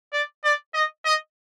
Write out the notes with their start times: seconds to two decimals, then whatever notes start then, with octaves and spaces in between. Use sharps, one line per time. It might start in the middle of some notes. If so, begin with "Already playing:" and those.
0.13 D5
0.44 D5
0.74 D#5
1.05 D#5